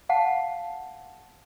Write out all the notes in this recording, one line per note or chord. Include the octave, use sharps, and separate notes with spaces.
F5 F#5 A5